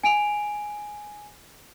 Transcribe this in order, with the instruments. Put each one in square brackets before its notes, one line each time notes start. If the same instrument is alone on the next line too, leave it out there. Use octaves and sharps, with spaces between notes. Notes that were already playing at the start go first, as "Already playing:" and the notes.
[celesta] G#5 D7 F7